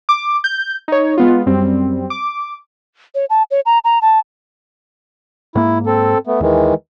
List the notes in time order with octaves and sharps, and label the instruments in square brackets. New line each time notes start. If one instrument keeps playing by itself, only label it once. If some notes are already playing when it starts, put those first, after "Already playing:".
[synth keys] D6
G6
D#4 C#5
G#3 B3 F4
F#2 G3 C4
D6
[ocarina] C#5
A5
C#5
A#5
A#5
A5
[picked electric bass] G#2 A#3 [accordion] E4
[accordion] C4 A4
A3 B3
[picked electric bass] D#2 [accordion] D#3 E3 G#3